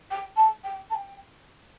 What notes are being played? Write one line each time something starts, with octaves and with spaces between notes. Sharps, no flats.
G5
A5
G5
A5
G5